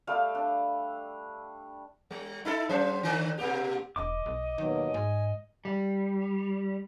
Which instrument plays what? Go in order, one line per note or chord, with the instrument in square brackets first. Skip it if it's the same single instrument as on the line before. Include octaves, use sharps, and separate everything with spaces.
[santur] G3 A3 F5 E6
D4
[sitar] G3
D#4 E4 A4
F#3 C#4 C5
D3 D#3
B2 A#3 G4
[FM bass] E1 [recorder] D#5 [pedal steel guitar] D6
[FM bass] B1
[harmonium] D#2 B2 F#3 [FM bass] D#3
[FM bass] G#2 [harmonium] G#5
[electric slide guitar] G3